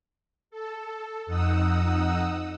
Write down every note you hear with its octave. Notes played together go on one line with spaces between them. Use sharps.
A4
F2 D#4 F#5 D#6 E6